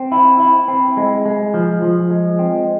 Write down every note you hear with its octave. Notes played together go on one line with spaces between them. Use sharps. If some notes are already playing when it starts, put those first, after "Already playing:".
Already playing: C4
E4
E4
C4
G#3
G#3
F3
F3
G#3
C4